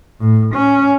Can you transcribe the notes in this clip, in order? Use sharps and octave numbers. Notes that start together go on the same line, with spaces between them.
A2
C#4